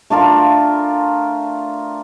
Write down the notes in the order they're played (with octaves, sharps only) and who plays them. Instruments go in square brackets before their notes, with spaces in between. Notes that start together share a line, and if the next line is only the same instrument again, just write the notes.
[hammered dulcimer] A3 D4 F4 A#4